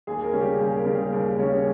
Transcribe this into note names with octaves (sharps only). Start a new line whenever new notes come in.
D#2 G#4
A#4
C#3 G3 C#4
G4
D#2 G#4
A#4
C#3 G3 C#4
G#4
D#2 A#4
C#3 G3 C#4 C#5